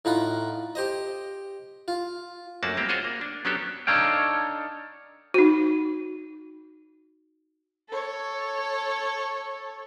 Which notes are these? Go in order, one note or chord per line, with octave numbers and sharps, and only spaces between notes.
A2 D#4 F4 F#5 B5
G4 C5 D#5
F4
F#2 A3 A#3 D4 F#4 A5
G3 A#3 C4 G4
F4 F#4 G#4 C5 C#5 D#5
A#3
D4
F#3 B3 C#4 D4 G4 A4
D4 D#4 A4 C#5 F5 G5
D#4 F#4
A4 C#5